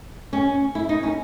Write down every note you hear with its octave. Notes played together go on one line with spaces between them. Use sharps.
C#4
E4
D#4
C#4